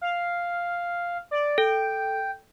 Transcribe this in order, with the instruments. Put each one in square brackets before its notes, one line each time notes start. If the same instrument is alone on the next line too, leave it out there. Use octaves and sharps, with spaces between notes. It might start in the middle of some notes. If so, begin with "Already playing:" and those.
[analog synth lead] F5
D5
[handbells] A4 [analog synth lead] G5